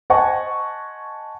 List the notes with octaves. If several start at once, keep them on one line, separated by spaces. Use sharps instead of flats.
C5 D#5 F#5 G#5 A5 C#6